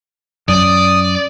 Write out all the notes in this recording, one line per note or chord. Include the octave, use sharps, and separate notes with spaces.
F#2 D5 D#6